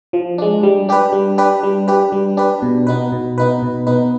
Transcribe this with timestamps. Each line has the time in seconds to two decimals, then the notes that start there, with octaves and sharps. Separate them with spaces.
0.13 F3
0.38 G#3 D4
0.63 G3
0.89 D4 G4 B4
1.12 G3
1.38 D4 G4 B4
1.63 G3
1.88 D4 G4 B4
2.12 G3
2.37 D4 G4 B4
2.62 B2
2.87 B3 D#4 B4
3.12 B2
3.38 B3 D#4 B4
3.62 B2
3.87 B3 D#4 B4